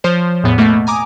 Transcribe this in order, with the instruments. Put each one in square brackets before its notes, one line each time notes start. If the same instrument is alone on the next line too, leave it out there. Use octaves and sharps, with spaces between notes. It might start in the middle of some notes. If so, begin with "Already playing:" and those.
[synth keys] F3 C5 C#5
E2 A2 B3
B2 A3 A#3
G#5 A#5 D6 D#6